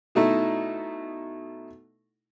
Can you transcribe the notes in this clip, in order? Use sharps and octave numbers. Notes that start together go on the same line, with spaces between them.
B2 A3 D#4 E4